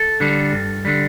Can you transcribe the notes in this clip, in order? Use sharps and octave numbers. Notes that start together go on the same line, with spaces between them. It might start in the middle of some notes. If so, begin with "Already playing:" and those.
Already playing: A4
D3 G3
G2
D3 G3